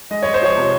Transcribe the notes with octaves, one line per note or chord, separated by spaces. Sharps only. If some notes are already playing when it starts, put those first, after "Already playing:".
G#3 D#5
G#3 C#5
C5
F3 C#5
C3